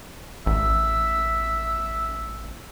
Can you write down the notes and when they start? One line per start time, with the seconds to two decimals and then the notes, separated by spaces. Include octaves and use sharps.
0.46 A1 E5